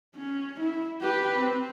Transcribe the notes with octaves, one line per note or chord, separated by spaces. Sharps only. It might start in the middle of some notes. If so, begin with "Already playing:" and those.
C#4
E4
G4 B4
C4